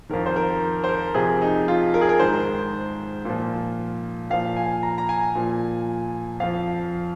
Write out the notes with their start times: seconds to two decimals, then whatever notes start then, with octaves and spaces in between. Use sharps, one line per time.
0.09 F2 D#3 A#4
0.26 C5
0.36 A#4
0.84 C5
0.89 A#4
1.14 F2 C3 F3 G#4
1.42 D#4
1.68 F4
1.94 A#4
2.01 G#4
2.09 A#4
2.19 G#2 D#3 C5
3.25 A#2 F3
4.30 A#2 F3 F5
4.57 G#5
4.83 A#5
4.98 A#5
5.09 G#5
5.35 A#2 F3
6.40 F2 F3 F5